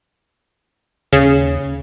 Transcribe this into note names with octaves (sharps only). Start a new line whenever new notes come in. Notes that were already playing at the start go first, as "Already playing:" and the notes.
D#2 C#3